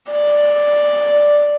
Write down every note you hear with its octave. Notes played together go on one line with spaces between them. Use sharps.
D5